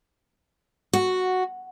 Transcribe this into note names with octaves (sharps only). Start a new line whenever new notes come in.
F#4